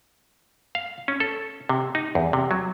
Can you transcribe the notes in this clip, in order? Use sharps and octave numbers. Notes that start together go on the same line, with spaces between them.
F5
C#4
A4
C3
D#4
E2
C3
F#3